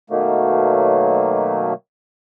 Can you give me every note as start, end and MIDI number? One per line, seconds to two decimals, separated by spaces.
0.10 1.73 47
0.10 1.73 51
0.10 1.73 54
0.10 1.73 57
0.10 1.73 58